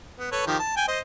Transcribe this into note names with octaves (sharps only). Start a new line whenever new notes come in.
B3
A4 B4 C#5
D#3 F3 G4
A5
G5 G#5
C5 D#5